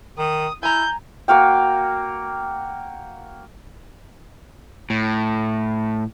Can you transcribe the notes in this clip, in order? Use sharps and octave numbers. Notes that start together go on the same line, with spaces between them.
D#3 D#6
E4 G#5 A#5 G6
A#3 F#4 F5 G5
A2